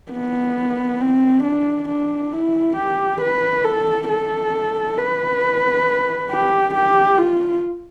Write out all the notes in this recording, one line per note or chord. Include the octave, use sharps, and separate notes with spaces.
B3
C4
D4
D4
E4
G4
B4
A4
A4
B4
G4
G4
F4